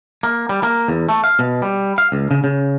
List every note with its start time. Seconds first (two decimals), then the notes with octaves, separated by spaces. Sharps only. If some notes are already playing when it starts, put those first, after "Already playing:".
0.23 A#3
0.49 G3
0.63 A#3
0.88 E2
1.09 A3
1.24 F5
1.39 B2
1.62 G3
1.98 F5
2.12 C#2
2.31 C#3
2.44 C#3